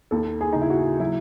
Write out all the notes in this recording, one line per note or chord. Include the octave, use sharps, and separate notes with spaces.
D#2 A4
G#4
C#3 D#4
E4
F#4
F#3 E4